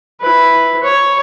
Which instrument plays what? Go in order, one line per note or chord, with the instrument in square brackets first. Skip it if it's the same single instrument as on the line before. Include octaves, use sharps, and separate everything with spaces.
[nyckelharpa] E4 B4
C#5